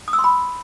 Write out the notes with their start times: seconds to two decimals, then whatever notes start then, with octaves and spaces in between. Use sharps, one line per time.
0.08 D#6
0.13 E6
0.19 C6
0.24 B5